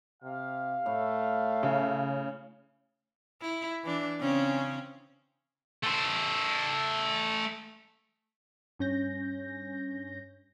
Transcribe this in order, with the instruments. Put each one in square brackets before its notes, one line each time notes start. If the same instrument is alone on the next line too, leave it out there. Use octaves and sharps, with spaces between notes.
[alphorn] C3 [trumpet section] F5
[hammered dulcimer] A2 [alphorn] A3
[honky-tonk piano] C#3 [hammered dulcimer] C#4
[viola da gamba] E4
E3 D4
C#3 C4 C#4
[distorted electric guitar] A3 C5
[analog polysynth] G2 C#4 G6 A#6